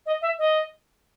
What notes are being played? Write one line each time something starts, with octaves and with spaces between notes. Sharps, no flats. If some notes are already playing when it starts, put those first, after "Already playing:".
D#5
E5
D#5